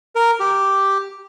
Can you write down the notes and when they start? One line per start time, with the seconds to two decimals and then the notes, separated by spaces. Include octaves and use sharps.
0.15 A#4
0.40 G4